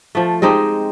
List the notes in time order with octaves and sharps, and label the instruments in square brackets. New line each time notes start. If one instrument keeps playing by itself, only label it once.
[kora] F3 A3
G#3 C4 D#4 G4